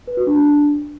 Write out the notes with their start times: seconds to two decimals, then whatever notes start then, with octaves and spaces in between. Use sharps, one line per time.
0.07 B4
0.17 F#4
0.27 D4